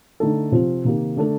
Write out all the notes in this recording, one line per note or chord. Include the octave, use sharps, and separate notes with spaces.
D3 A3 D#4 A4
C3 F3 C4 F4
C3 D#3 A#3 D#4 G4
D3 A3 D4 A4